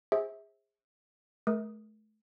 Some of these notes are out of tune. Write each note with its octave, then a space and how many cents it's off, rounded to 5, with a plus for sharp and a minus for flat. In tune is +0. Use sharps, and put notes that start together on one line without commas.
G#4 -25 C5 +20 E5 -25
A3 -35 A#4 +25 D#6 +0